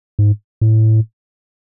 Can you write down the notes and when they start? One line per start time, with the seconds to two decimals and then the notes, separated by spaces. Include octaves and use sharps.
0.19 G#2
0.61 A2